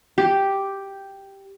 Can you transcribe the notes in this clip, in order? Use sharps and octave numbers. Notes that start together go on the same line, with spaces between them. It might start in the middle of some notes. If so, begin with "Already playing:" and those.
G4